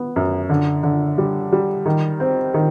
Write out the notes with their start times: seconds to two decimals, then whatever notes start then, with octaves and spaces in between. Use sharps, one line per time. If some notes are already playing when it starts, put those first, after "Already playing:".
Already playing: B3
0.16 F#2
0.49 D3
0.83 D3
1.18 G3
1.53 G3
1.86 D#3
2.20 C4
2.54 D#3